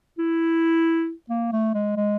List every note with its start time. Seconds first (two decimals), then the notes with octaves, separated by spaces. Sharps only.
0.18 E4
1.30 A#3
1.52 A3
1.74 G#3
1.96 G#3